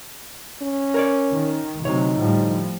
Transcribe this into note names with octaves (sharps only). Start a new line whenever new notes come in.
C#4
A#4 C#5 D5
D#3
D2 C3 F#3 D#4 C#5
A2 F3 G3